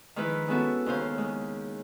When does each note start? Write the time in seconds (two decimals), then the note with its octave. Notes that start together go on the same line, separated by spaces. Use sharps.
0.16 D#3 F3 G#3 E4 B4
0.48 G#3 B3 C#4 E4 F#4 A4
0.86 D#2 C#3 C5 F5
1.18 G#3